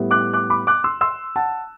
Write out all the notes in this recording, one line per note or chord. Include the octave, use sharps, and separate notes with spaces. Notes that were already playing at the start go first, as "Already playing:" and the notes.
Already playing: A2 G3 B3 E4
D6 F#6
D6 F#6
B5 D6
D6 F#6
C6 E6
C6 E6
F#5 A5